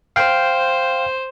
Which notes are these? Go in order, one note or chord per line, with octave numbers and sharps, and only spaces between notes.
C5 F5 G5